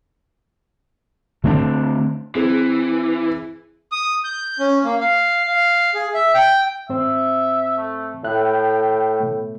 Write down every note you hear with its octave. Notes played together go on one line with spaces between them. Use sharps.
D3 A3 C4 D4
E3 C4 G#4
D#6
G6
C#4
A#3
F5
F5
G#4
E5
G5
G#2 C4 C5 E5
A3
A2 E5 G5 F#6
B2 A3